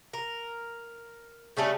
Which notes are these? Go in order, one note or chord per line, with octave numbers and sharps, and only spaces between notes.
A#4
C#3 G3 A3 C#4